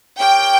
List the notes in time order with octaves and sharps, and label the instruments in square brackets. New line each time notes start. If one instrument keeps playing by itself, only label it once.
[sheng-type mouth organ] G4 A#4 C#5 [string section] G5